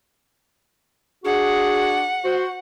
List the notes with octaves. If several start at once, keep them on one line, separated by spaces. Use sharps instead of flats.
D4 F#4 G#4 F#5
F#4 C5